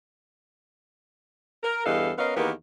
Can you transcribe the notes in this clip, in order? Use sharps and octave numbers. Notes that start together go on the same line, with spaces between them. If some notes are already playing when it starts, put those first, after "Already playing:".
A#4
E2 G2 E3 A4 D#5 F5
B3 C#4 A#4 D#5 F5
E2 D#3 A#3 B3 G4 B4